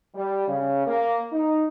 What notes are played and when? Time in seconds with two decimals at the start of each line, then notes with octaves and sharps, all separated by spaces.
0.15 G3
0.48 C#3
0.87 A#3
1.32 D#4